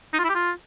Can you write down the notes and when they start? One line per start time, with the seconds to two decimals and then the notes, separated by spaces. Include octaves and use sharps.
0.13 D#4
0.19 F4
0.24 E4
0.30 G4
0.35 F4